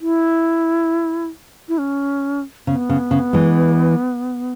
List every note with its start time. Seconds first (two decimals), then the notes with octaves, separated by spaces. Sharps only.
0.01 E4
1.69 E4
1.78 C#4
2.67 C#3 B3
2.89 C#3
3.11 C#3
3.33 E3 G#3